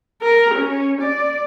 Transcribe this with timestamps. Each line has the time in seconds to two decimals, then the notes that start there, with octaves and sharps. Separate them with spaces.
0.22 A#4
0.54 C#4
1.01 D5